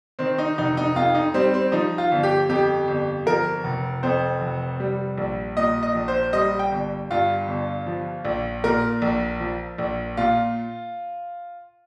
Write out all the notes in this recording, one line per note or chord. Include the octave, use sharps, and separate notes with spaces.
D#3 C4
D#4
F1 D#4
D#4
F2 F4
D#4
G3 C4
C4
F3 D#4
F4
G1
G4
F2 G4
G1
F3 A#4
F1
F2 C5
F1
G3
A#1
A#2 D#5
D#5
A#1
C5
G3 D#5
G5
G1
G2 F4
G1
F3
A#1
A#2 A#4
A#1
F3
A#1
A#2 F4